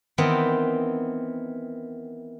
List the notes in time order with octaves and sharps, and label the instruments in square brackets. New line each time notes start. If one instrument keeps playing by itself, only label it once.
[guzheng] D#3 E3 B3 C4 D#4